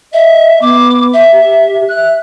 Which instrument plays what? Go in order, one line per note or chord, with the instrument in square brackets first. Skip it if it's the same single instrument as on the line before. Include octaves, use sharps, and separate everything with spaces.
[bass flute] D#5 [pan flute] E5
[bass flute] B3 [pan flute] D6
[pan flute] E5
[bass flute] G4
[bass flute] E5 [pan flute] F#6